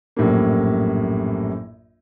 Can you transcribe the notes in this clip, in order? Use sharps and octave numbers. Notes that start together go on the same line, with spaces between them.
A#1 F#2 A2 G3 A#3